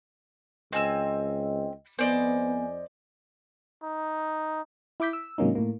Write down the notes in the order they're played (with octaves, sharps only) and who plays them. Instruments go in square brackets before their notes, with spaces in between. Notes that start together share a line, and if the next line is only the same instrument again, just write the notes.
[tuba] C#2 [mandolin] C4 G#5 E6 [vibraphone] D#5
[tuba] F2 [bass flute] B3 [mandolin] C5 D5 D#5 [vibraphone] G#5
[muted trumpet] D#4
[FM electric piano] E4 E5 D6 G6 B6
E6
G#2 C3 F#3 A#3 C#4 D#4
A2 A#3